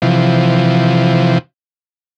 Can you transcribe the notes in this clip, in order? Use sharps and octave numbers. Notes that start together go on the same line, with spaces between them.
C3 E3 F3